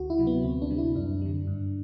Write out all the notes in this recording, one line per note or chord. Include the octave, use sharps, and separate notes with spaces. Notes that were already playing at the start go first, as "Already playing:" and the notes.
Already playing: D2 F#4
E4
C3 F#3
B3
D2 C4
D4
C3 G3
E4
F#2 D4
D3 G3
G2